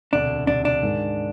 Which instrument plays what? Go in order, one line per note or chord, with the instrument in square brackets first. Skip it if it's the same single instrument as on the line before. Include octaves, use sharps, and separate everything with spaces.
[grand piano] E1 D2 C3 [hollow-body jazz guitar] D4
[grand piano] E1 D2 C3 [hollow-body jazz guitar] D4
[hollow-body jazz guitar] D4
[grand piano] G#2 D#3 G#3